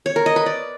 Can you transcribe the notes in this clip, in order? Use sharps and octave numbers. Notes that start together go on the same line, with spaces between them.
C#5
A#4
D#5
B4
D5